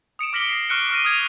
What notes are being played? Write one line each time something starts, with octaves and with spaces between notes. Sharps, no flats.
D#6 C#7 D7 E7
D6 F6 A#6 B6 F#7 G7
A#6 C7
C#6 F6 F#6 C#7 D7
D6 F6 A#6 D#7
D#6 F6 G#6 F7